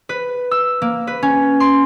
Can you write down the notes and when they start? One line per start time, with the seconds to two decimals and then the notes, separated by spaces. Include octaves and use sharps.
0.09 B4
0.51 E6
0.82 A#3
1.07 B4
1.22 C#4
1.60 C6